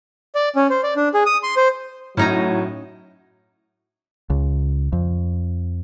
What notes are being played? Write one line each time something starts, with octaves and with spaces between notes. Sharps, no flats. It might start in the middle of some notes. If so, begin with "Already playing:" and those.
D5
C#4
C5
D5
D4
G#4
D#6
C6
C5
A2 F#3 C#4 D#4 A#5
C#2
F2